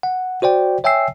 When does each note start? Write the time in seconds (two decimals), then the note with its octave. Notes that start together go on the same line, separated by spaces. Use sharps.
0.03 F#5
0.42 F#4 C5 D5 G5
0.84 C#5 E5 G5 G#5 E6 C7